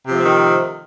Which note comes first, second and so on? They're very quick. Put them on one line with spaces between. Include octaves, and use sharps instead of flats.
C3 F3 A3 C4 D#3